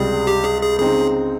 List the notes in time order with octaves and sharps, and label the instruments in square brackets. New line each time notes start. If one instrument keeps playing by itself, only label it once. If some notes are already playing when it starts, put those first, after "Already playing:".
Already playing: [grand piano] C#2 C3 G3 [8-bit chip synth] G#4
[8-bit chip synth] G4
G#4
G#4
[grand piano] C#3 G#3 C4 D#4 [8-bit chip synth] G#4